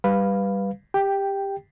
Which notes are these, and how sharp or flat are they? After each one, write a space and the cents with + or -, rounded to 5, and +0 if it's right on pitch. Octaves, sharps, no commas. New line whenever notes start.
G3 +0 B4 +0 F5 +0
G4 +15 G5 +0